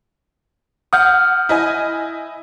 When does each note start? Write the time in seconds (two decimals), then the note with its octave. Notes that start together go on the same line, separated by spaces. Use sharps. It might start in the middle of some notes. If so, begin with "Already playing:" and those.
0.93 F#5 D#6 F6 G6
1.49 E4 D#5 G#5